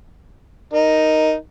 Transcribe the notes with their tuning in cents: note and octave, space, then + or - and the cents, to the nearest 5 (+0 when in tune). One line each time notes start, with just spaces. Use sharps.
D#4 +0 A#4 +0